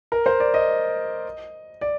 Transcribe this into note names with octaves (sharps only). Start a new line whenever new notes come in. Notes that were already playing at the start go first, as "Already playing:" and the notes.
A#4
C5
D5
D#5
D5